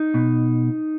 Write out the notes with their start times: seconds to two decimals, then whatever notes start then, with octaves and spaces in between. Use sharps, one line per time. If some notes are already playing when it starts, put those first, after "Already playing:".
Already playing: D#4
0.14 B2